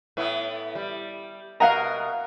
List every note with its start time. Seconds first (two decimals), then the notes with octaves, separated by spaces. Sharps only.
0.17 A2 B3 E4
0.75 G3
1.60 B2 A#4 D#5 F5 F#5 A#5